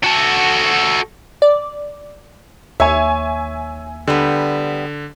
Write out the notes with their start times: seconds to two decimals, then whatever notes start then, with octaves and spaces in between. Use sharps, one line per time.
0.04 F#4 A4
1.42 D5
2.80 D#2 C#5 E5 G#5
4.07 D3 G3 B3